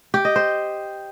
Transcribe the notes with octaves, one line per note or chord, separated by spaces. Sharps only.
G4
D#5
C5